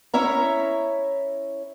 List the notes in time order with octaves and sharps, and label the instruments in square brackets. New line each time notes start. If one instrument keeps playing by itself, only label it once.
[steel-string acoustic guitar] C#4 E4 C#5 E5 A#5